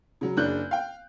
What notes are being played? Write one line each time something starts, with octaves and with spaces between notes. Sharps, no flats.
C#3 F#3
F#1 C#3 D4 F#6 G6
F5 G5